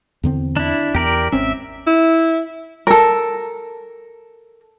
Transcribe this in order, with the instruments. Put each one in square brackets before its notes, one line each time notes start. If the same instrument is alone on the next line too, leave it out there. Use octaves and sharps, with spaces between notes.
[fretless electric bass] E2 D3 C4
[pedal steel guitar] D4 E4
[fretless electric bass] E2 [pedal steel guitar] G4 A#4 D5
[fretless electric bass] G#1 C4 C#4 [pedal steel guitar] E5
[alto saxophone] E4
[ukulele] A4 A#4